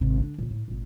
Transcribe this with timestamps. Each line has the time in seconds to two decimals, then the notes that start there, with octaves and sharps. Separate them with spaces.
0.01 G#1 C3
0.19 D3 D4
0.39 A#2 C#3
0.51 A2
0.68 G#1 A#2